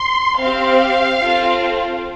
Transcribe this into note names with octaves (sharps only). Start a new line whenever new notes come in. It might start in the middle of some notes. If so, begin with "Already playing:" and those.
Already playing: C6
C4 G4 F5
C4 F4 A4